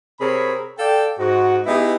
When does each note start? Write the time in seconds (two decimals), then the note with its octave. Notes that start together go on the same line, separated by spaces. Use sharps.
0.20 C3 C4 G#4 A#4 C#5 B5
0.78 A4 D5 F5 G5
1.18 G#2 F#4
1.66 B3 D#4 E4 G4 G#4 B4